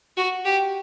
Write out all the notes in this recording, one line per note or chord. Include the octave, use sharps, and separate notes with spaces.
F#4
G4